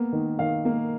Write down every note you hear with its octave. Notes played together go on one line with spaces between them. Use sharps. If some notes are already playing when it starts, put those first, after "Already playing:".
Already playing: A#3 B3
D#3
D#3 F5
A#3